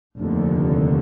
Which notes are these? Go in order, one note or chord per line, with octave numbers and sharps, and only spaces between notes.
F1 D#2 D3